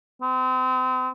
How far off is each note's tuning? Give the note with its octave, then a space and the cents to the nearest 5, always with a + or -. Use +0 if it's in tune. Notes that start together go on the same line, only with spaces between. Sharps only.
C4 -35